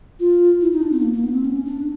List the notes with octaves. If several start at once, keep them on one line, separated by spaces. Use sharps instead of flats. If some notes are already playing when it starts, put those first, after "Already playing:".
F4
E4
D#4
D4
C4
B3
A#3
A#3
B3
C4
C#4
D4